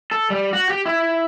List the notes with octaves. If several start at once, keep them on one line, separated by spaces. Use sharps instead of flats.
A4
G3
F#4
G4
E4